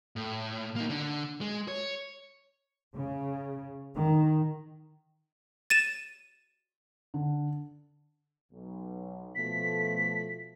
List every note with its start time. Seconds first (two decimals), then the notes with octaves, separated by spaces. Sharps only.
0.16 A2
0.76 A#3 D#4
0.90 D3
1.41 G#3
1.68 C#5
2.97 C#3
3.96 D#3
5.70 A6 D#7 E7
7.14 D3
8.52 B1
9.35 B2 F3 A3 B6